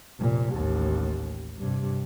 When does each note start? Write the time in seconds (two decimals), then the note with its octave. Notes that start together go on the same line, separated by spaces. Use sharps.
0.19 F1 A#2
0.54 A1 D#2
1.58 G2 C3